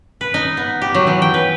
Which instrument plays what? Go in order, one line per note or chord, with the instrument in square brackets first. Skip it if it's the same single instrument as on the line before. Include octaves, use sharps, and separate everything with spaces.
[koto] B4
D#4
B3
G4
F#3
E3
G5
B4